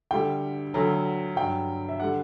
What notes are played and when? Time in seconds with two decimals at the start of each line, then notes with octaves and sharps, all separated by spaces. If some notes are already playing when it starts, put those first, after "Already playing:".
0.11 D2 D3 G3 G5
0.74 D2 D3 F#3
1.36 G2 F#3 G5
1.89 E5
2.00 D3 G3 F#5